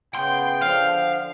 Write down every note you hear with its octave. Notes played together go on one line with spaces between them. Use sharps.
C#3 B3 G5 C6
D3 F3 F5